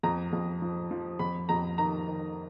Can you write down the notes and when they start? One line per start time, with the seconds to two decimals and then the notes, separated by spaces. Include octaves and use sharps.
0.03 F2 A#5
0.33 F2
0.62 F3
0.91 F3
1.19 F2 B5
1.49 F2 A#5
1.78 D#3 A#5
2.08 D#3